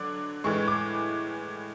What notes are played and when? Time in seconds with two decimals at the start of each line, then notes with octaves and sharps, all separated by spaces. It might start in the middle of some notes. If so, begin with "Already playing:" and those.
Already playing: D3 F#3 D4 D6
0.44 A2 E3 G#3 C#6
0.68 D6